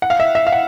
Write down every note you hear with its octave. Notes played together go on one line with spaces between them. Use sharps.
F#5
F5
E5
E5
F5
F#5